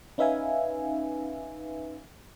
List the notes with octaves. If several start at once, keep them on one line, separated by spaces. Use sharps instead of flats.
C#4 D#4 B4 E5 F5 G#5